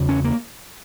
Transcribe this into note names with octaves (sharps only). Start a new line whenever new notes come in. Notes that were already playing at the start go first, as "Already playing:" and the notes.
Already playing: E2 C#3
C#4
A#3